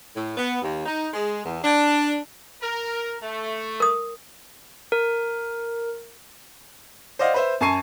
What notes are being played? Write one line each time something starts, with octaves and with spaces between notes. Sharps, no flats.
A2
B3
D#2
D#4
G#3
E2
D4
A#4
A3
A#4 D#6
A#4
C5 D5 D#5 F5 F#5
B4 C5 E5
F#2 G#5 A5 C#6 C7 D#7